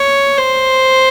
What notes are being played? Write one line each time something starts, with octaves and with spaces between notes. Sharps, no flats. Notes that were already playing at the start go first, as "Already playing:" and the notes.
Already playing: C#5
C5